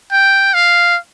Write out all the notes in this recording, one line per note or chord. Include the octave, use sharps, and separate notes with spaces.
G5
F5